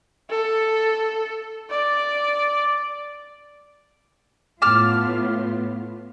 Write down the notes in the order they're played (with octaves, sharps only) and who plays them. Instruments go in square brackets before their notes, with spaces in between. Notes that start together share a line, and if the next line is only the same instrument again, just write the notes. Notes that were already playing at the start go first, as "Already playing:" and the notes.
[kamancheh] A4
D5
[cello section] A2 B3 F4 [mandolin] A5 D6 F6